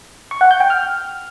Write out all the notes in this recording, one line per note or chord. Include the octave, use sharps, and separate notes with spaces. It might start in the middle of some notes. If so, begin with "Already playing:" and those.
C#6
F#5
G6
G5
F6